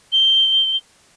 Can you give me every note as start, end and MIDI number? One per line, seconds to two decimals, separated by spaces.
0.12 0.77 103